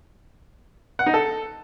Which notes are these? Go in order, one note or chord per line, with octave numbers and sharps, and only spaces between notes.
F#5
D#4
A4